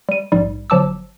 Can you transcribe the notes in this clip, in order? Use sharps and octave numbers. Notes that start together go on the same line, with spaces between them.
G3 D#7
A#1 G#2 G3
G1 F3 F#3 A5 D6 E6